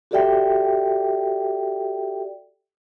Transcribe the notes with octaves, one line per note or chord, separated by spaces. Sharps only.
F#4 G4 A4 D5 E5 G5